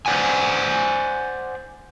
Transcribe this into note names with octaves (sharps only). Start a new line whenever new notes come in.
C5 D5 F#5 G#5